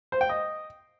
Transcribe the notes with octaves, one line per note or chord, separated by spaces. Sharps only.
C5
G5
D#5